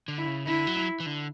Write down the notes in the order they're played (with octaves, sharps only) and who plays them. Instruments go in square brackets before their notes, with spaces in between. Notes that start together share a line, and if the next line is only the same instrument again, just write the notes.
[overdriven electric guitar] D3
[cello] E4
[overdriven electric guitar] C#3
[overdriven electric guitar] D3 [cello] E4
[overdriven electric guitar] F#3
E3
D3